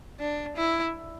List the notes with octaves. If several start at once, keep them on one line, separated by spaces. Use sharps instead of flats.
D4
E4